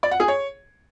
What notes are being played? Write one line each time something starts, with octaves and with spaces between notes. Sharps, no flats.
D5
F#5
G#4
C#5